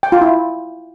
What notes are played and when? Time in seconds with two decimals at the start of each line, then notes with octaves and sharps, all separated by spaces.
0.03 G5
0.12 F4
0.21 E4